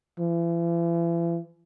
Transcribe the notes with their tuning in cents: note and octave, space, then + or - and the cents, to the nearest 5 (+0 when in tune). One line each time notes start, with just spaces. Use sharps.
E3 +40